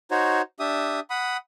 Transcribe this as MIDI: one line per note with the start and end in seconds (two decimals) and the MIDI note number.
0.11 0.42 63
0.11 0.42 66
0.11 0.42 72
0.11 0.42 73
0.59 1.00 62
0.59 1.00 67
0.59 1.00 76
0.59 1.00 87
1.10 1.37 78
1.10 1.37 83
1.10 1.37 87